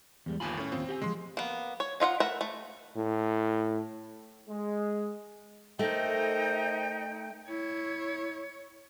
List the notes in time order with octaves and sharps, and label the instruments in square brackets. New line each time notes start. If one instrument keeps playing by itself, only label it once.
[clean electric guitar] E2 G3 G#3
[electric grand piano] G1 D#2 F4 [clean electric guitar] G#5 B5
[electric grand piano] A2 C#4
[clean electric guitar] D#2 G#2 F4 [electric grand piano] C4
[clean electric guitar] G4 F#5 G#5
[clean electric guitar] D2 F3 [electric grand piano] G#3 C6
[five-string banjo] A#3 B3
C#5
D#4 F4 E5 F#5
A3 A#4 B4 E5 F#5
A3
[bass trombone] A2
[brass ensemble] G#3
[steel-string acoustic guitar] A3 [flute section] D#4 G5 G6 [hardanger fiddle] A#4 C5 [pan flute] D#5
[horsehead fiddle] E4 [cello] C#5